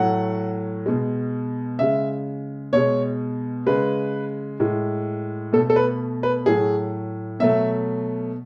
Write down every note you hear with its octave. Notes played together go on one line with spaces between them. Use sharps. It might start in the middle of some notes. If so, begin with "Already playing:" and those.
Already playing: A2 F#3 A3 F#5
B2 G#3
C#3 G#3 E5
B2 G#3 C#5
C#3 G#3 B4
A2 G#3
B2 A3 A4
A4
B4
B4
A2 F#3 A3 G#4
B2 F#3 A3 E5